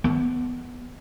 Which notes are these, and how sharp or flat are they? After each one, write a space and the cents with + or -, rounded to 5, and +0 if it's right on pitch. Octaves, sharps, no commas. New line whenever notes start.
B3 +5